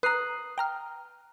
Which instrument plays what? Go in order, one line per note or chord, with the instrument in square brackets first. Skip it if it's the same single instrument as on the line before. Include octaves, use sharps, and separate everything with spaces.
[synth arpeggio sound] B4 A#5 [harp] D#6 F#6 C7
[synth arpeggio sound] G5 A#5 F6